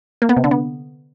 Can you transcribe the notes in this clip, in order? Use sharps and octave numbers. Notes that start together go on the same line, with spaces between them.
A#3
B3
C3
D3
B3